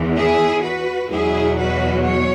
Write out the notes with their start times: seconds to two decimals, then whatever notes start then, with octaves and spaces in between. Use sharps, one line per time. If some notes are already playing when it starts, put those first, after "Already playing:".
Already playing: E2 E3
0.15 E4 G#4
0.62 F#4 B4
1.10 E2 B2 F#3 E4 G#4
1.57 F#4 B4
2.05 C#5